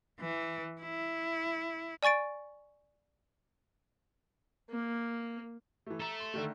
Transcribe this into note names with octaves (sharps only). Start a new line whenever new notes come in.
E3
E4
D5 G#5 C#6 A6 D7
A#3
E3 A3
A4 E5 A#5
C6
D3 D#3 A3